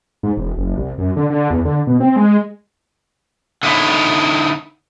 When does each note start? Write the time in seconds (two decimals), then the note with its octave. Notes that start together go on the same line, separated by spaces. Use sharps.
0.23 G#2
0.37 E1
0.57 F#1
0.77 C2
0.98 F#2
1.16 D3
1.30 D3
1.50 E2
1.65 D3
1.87 B2
2.00 C4
2.16 G#3
3.63 D3 D#4 E4 C#5